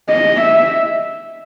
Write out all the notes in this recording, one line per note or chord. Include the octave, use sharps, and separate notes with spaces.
D#5
E5